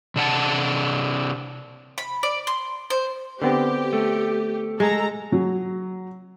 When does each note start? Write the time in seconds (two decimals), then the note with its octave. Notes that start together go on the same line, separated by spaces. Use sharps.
0.16 C3 D4 F#5 A5
1.98 B5
2.23 D5
2.47 C6
2.90 C5
3.42 D3 B3 C4 G4
3.93 A3
4.80 G#3 A4 A#5
5.32 F#3